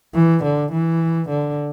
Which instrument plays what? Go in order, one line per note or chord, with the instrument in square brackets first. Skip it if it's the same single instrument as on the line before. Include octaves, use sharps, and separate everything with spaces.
[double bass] E3
D3
E3
D3